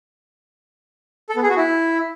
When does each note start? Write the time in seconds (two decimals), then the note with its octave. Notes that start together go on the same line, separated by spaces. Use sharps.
1.29 A4
1.36 B3
1.43 G#4
1.50 F#4
1.57 E4